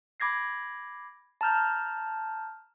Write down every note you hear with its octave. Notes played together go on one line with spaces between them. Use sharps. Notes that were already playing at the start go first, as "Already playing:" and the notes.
B5 D6 G#6 A#6 C7
A5 A#5 F6 G6